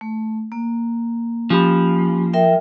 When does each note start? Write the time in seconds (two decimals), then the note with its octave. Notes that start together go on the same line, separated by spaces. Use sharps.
0.01 A3
0.52 A#3
1.50 F3 C#4 G4 B5
2.33 A#4 E5 G5